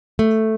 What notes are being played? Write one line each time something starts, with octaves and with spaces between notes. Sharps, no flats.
A3